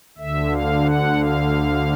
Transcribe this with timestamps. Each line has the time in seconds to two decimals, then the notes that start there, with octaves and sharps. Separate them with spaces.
0.18 D2 D3 E5
0.52 F5
0.86 F#5
1.19 F5